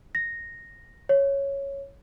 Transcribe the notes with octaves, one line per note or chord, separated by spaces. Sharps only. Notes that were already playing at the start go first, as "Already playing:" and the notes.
A#6
C#5